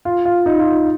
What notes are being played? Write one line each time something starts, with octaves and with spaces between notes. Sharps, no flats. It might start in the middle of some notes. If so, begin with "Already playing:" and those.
F4
F4
D#4
F4
D#4